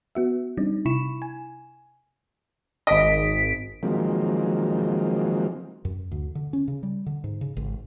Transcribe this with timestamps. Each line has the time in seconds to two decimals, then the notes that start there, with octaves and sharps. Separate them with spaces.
0.15 B3 F#4 E5
0.57 G3 C4 D4 D#4
0.85 C3 E4 B5 C#6 E7
1.22 G#5
2.87 G#1 D#5 B6 D7
3.83 D#3 F3 F#3 G#3 A#3 C4
5.85 F#2
6.11 D2
6.35 D3
6.53 C#4
6.68 C#3
6.83 G3
7.06 D3
7.24 G#2
7.41 C#3
7.57 G#1